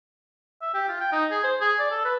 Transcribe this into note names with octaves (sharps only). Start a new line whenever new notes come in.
E5
G4
F4
G5
D#4
G#4
C5
G#4
D5
A4
B4